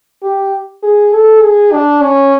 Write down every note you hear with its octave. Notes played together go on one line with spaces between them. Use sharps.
G4
G#4
A4
G#4
D4
C#4